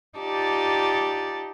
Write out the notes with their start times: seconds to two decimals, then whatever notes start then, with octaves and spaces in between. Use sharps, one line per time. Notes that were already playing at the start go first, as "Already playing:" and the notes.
0.17 D#4 F4 G4 D5 A5